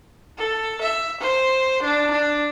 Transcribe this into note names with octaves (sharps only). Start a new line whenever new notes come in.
A4
E5
C5
D4
D4